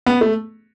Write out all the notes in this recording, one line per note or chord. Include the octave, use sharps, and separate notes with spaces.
B3
A3